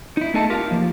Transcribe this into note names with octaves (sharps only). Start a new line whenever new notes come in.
D#4 E4
A3 B3 G#4 A4 D#5 A5
F4 G4 A#4 F5
F3 A#3